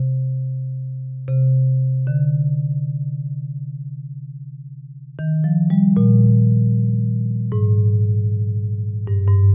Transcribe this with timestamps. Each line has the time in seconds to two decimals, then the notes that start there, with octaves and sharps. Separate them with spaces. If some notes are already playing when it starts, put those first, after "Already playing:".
Already playing: C3
1.28 C3
2.07 D3
5.19 D#3
5.44 F3
5.70 G3
5.97 A#2
7.52 G#2
9.07 G2
9.27 G2